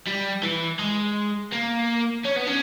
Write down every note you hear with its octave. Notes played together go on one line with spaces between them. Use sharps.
G3
E3
G#3
A#3
C#4
B3
C#4